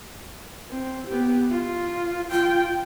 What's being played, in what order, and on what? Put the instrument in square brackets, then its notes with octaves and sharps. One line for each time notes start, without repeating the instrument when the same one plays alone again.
[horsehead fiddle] C4
B3 G4
F4
[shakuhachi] F4 [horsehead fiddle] G5